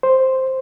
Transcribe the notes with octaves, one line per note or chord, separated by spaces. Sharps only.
C5